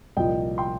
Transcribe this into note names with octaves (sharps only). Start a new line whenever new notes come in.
C2 A#2 F3 D#5 G5
G5 C6